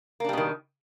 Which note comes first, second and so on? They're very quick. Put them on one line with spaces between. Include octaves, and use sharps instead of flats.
A#3 D4 G3 B2 D#3